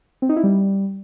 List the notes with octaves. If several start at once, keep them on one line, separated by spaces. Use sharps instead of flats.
C4
D#4
E4
G3